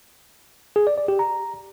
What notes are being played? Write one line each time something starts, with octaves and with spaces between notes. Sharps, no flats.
G#4
D5
D5
G4
A#5